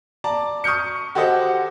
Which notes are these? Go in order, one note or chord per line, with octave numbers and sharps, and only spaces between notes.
D5 A5 A#5
C#6 D#6 F6 G6 C#7
F#4 G4 A4 C5 D#5 F#5